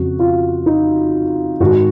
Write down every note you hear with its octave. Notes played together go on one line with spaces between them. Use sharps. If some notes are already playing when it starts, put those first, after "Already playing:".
Already playing: F2 C#3 F#4
F4
D#4
G#2 D#3 F#4